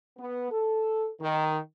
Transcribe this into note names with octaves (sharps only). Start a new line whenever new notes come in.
B3
A4
D#3